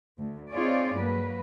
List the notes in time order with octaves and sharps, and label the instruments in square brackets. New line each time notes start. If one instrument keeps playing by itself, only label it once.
[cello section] D2
C4 D#4 F4 G#4 C#5 D5
G2 F#3 A#3 B4